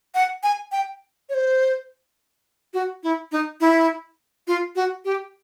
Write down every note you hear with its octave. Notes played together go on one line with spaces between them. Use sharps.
F#5
G#5
G5
C#5
C5
F#4
E4
D#4
E4
F4
F#4
G4